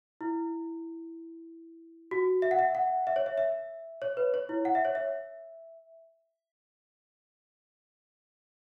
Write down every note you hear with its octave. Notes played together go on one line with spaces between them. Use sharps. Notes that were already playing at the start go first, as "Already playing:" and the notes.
E4
F#4
E5
F#5
E5
F#5
E5
C#5
E5
E5
C#5
B4
C#5
E4
F#5
E5
C#5
E5